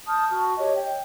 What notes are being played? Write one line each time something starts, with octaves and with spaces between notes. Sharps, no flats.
A5 D#6 F6 G6
F#4 A5
G4 C#5 D#5
G5